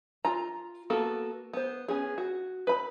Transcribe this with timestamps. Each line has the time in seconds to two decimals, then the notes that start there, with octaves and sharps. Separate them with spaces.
0.25 F4 A#5
0.90 A#3 B3 F#4 A4
1.54 B3 C5
1.88 B3 C#4 G#4
2.18 F#4
2.67 B4 B5